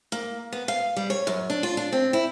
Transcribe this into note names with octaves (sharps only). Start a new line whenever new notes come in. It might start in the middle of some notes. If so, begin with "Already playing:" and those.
A#3
B3
F5
G3
C#5
F#2
D4
F4
D4
C4
E4